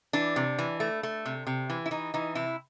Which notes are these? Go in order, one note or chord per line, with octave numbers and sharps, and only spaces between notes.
E3 D4
C3
E3
A3
A3
C3
C3
E3
E4
E3 D#4
E3 D#4
C3 E4